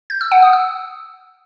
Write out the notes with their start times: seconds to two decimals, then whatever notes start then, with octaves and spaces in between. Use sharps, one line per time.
0.10 G6
0.21 E6
0.32 F#5
0.42 D#6
0.53 E6